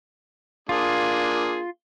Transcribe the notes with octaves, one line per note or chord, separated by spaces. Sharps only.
A#3 D4 F4 G#4